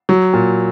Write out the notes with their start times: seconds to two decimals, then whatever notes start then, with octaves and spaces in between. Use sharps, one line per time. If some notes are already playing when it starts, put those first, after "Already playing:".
0.09 F#3
0.33 A#2